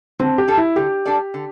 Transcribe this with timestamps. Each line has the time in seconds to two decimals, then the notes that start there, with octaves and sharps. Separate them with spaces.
0.19 D3 C4
0.38 G4
0.48 G3 D4 A4 D5
0.57 E4
0.76 D3 G4
1.05 G3 D4 A4 D5
1.34 D3